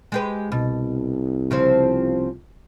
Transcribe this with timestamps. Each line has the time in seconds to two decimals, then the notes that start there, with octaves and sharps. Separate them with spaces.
0.12 G#3 G4 B4
0.52 C2 B2
1.51 C#3 F3 C4